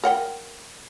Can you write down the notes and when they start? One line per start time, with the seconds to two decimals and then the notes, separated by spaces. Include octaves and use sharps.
0.04 A#4 F#5 G5